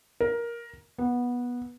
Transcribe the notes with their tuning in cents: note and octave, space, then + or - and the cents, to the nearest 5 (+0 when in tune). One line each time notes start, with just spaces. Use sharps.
A#4 +10
B3 -15